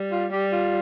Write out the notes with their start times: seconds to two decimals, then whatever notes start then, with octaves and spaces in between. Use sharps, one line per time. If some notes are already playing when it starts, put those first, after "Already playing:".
Already playing: G3
0.12 F4
0.32 G3 G4
0.53 F4